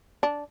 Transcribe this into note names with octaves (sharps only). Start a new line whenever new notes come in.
D4